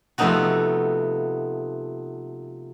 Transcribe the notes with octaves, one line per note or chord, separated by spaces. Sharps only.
C3 F3 A3 B3 D#4 F#4